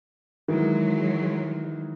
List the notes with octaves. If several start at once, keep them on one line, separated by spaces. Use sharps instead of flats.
D#3 E3 F#3 G#3